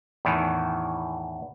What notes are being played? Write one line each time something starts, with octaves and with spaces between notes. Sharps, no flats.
E2 A2 D#3 E3